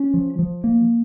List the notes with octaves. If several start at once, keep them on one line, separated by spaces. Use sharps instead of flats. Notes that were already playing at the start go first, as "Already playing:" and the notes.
Already playing: C#4
F3
F3
A#3